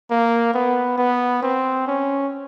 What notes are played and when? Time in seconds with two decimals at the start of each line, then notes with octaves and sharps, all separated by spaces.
0.11 A#3
0.54 B3
0.98 B3
1.42 C4
1.87 C#4